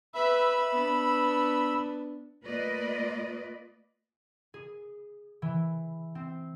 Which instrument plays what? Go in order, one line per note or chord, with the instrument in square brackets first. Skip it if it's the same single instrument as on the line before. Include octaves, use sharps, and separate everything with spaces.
[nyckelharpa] B4 E5 [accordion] B5 E6
[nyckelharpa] B3 D4
[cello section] A3 A#3 F4 B4 D5 D#5
[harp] G#4
E3
C4